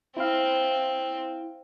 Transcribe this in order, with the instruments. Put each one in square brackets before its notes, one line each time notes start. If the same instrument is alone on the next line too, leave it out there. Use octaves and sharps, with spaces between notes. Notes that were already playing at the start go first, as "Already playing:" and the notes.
[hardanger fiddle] C4 [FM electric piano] E4 F5